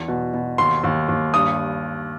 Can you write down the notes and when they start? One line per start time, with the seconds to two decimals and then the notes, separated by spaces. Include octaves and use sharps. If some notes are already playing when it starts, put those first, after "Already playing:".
Already playing: E2
0.08 B2
0.34 B2
0.58 D#2 C6
0.84 D#2
1.09 D#2
1.34 G2 D#6